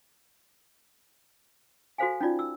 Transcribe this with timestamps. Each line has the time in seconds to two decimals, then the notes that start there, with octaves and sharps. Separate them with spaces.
1.98 F#4 A4 C5 F5 G#5
2.21 C#4 D#4 F4 D5
2.39 E6